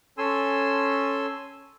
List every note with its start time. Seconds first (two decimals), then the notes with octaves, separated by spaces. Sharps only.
0.18 C#4 A4 G#5 C6 E6